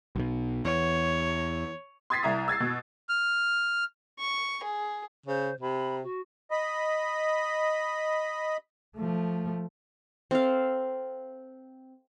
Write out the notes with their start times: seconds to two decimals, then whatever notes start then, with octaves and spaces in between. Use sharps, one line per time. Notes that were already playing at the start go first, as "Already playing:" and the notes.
0.16 B1 B2
0.65 E2 C#5
2.10 C6 D#6 G#6 A6 B6 C7
2.23 C2 E4 A#5 D#6
2.48 E6 G#6 A6 C7
2.60 B2
3.09 F6
4.19 C#6
4.64 G#4
5.26 C#3 C5
5.61 C3 B5
6.03 F#4
6.51 D#5 B5
8.96 F3 A3
10.31 C4 A4 F5